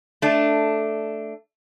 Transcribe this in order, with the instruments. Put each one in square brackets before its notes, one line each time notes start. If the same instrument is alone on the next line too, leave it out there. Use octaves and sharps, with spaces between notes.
[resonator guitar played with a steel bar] A3 D4